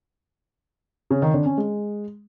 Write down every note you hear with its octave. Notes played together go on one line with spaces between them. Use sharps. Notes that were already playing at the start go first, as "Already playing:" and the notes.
C#3
D#3
D3
C#4
G#3